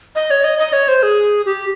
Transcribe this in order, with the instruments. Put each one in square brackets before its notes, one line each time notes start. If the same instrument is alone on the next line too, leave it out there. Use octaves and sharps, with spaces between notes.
[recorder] D#5
C#5
D#5
D#5
C#5
C5
G#4
G4